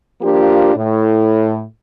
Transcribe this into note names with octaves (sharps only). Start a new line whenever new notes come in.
F3 A#3 D4 F4 G4
A2